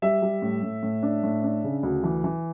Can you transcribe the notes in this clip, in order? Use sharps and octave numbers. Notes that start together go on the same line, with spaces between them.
G3 E5
G3
A2
A2
A2
D4
A2
D4
C#3
D2
E3
E3